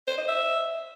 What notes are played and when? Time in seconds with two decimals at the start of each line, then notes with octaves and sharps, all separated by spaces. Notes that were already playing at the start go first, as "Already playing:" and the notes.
0.08 C5
0.18 D#5
0.28 E5